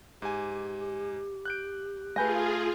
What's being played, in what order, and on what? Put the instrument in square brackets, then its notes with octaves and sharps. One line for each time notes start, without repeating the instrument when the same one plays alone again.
[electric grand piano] G#2 G#5 [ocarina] G4
[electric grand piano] F#6 G6 D7
[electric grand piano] A3 G6 A#6 [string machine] F4 G#4 [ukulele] B4 G#5